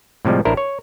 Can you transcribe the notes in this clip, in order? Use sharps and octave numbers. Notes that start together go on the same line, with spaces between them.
A2 C3 F3 G3 G#3
A1 D4 E4 A#4 C5
C#5